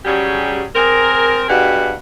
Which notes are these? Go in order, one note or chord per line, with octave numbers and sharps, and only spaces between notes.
C#3 F#3 G3 G4 G#4
C4 G#4 A#4
G2 B2 G4 G#4 F#5